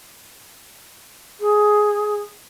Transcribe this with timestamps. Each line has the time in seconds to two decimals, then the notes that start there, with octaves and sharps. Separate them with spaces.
1.40 G#4